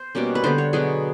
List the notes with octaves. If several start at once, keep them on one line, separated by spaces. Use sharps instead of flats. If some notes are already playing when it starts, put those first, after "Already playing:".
Already playing: C5
B2 G3 A#3 C#4
B4
D3 G3 B3 C5
C#5
B2 F#3 B3 G#4